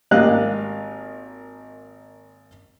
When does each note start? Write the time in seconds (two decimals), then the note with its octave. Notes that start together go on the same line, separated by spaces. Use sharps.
0.11 G#1 A#3 G4 D#5 F5 F#6